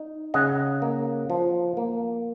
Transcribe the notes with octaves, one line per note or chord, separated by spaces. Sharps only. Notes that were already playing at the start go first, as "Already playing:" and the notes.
Already playing: D#4
C#3 D#5 F#5
A#3
F3
A#3